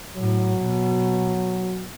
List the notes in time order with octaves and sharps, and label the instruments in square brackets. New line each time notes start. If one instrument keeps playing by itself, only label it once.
[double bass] A2 [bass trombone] F#3
[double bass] B2